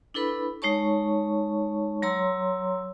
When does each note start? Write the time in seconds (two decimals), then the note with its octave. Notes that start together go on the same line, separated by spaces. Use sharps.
0.14 D4 E4 A4 B4 B5
0.62 G#3 D#4 C#5 A5 C#6
2.02 F#3 C#5 A#5 C6 E6